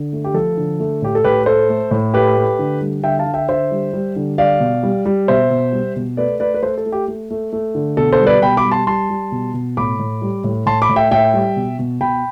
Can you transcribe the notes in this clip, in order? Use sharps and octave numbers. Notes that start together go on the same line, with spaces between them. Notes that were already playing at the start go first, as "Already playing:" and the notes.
Already playing: D3
A3
G4
F3 A4
D3
A3
A2 G4
A4
A2 G4 B4
A3 A4 C5
A3
A2
A3 G4 B4
A3
D3
G3
D3 E5 G5
F5 A5
D3
E5 G5
D3 C5 E5
G3
G3
D3
G3 D5 F5
B2
G3
G3
B2 C5 E5
B2
G3
B2
A3 B4 D5
A3 B4 D5
B4
A3 A4 C5
A4
A3
G4
A3
A3
A3
D3
B2 A4
A4 C5
G3
B4 D5
B2 G5 B5
B5 D6
G3
A5 C6
G3 A5 C6
G3
B2
B2
A2 B5 D6
A2
G3
A2
A2 A5 C6
B5 D6
A2
E5 G5
A2 E5 G5
G3
B2
B2
B2 G5 B5